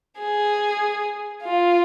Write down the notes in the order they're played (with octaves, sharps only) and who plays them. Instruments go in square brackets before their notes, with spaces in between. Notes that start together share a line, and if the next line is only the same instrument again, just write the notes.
[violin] G#4
F4